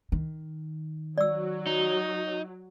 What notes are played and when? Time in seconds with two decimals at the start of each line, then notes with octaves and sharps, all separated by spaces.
0.12 D#3
1.18 F#3 D5 E6
1.67 D#4